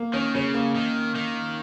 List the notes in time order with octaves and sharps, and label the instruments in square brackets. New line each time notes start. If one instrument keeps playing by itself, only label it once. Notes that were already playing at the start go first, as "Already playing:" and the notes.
Already playing: [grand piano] A#3
[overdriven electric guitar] D#3 [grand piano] C#4
[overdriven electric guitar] C#3 [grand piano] C#4
[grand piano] A#3
[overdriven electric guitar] D#3
D#3